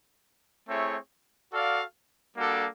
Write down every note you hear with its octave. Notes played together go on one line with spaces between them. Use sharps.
A3 C4 E4 G#4 C#5
F#4 A4 D5 F5
G3 A#3 D4 F#4 A4